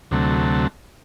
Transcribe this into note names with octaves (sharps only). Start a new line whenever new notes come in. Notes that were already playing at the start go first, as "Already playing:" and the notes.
D2 C3 F#3 A3